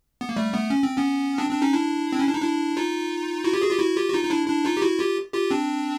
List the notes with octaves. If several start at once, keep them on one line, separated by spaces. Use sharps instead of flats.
B3
A#3
G3 A3
A3 B3
C#4
C4
B3 C#4
C4 D4
C4 D4
C#4 D#4
D4 E4
C4
C#4
D4
D#4
D4 E4
D#4 F4
E4 F#4
F4 G4
F#4 G#4
F4 G4
E4 F#4
F4 G4
F#4
D#4 F4
D#4
D4 E4
D4 E4
D#4 F4
G4
E4 F#4
F4 G4
F4 G4
C4 D4